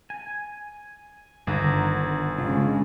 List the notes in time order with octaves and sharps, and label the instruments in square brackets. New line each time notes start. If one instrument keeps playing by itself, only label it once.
[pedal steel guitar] G#5
[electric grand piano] G1 [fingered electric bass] G2 D3 D#3 [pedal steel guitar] G#4 F#5 A#5
[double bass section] C#3 G#3 [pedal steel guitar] D4 F4